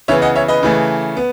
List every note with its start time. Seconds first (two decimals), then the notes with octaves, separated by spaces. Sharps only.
0.08 C#3 E3 B3 C#5 E5
0.22 D#5 F#5
0.36 C#5 E5
0.48 B4 D#5
0.63 C#3 E3 A3
1.17 B3